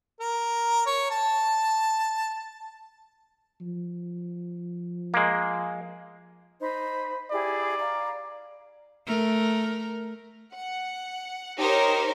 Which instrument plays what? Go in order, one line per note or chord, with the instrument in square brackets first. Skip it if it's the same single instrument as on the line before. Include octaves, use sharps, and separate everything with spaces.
[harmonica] A#4
C#5
A5
[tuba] F3
[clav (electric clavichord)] G#3 A#3
[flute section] D#4 C5 B5
[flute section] E4 G4 G#4 [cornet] D5
[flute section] F5 A#5
[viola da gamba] A3 A#4
[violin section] F#5
D#4 G4 A#4 C5 C#5